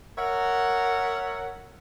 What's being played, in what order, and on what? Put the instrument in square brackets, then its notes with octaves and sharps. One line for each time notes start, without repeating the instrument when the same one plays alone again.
[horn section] A#4 C#5 E5 F#5